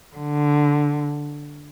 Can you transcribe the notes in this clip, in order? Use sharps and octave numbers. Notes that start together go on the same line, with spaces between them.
D3